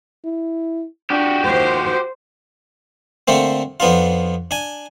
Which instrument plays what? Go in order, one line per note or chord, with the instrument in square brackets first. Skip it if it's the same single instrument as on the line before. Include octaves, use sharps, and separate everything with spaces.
[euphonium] E4
[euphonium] D4 [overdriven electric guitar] F#4 G4
[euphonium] D#2 [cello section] C5
[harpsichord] D3 A3 A#3 C4
F2 B3 D4 F4
D4 G#5